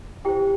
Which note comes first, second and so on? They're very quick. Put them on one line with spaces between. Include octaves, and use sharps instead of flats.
E4 G4 G5 C5